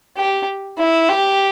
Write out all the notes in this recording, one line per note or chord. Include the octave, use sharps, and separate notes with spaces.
G4
E4
G4